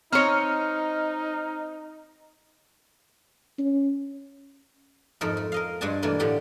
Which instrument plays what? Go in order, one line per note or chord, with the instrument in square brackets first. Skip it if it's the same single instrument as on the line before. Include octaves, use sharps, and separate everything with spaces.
[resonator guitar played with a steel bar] C4 C#5 [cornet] D#4 [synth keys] D#5 A#5 F6
[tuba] C#4
[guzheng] F2 G#2 A3 A4 A#4
A3
A#4 D#5 F5
G2 G#3 D4 G#5 A5
B2 E3 A3 A#3 D4 G#5
A2 D3 G4 A4 F#5 G5